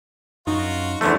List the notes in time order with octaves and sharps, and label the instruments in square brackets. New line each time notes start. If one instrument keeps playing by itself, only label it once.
[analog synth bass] F#2 [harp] D#4 [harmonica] F4 F#4
[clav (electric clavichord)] E2 D3 A3 [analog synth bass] F3 [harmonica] C5